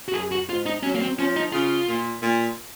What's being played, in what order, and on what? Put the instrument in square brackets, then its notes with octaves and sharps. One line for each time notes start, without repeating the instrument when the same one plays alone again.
[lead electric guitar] F#4
[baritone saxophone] F#2 [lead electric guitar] G#4
[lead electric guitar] F#4
[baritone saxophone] G#2 [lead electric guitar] F4
[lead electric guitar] D#4
[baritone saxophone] F#3 [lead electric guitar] C#4
[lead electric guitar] A#3
C4
[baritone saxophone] F3 [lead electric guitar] C#4
[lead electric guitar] D#4
[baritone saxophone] C#3 [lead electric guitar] F4
[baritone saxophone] A#2
A#2